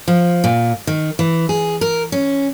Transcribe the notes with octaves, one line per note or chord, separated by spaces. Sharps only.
F3
A#2
D#3
E3
G#4
A#4
C#4